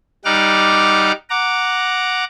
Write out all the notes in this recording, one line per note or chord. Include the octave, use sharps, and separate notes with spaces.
G3 D#4 F#5 D6 F6
F#5 A#5 D6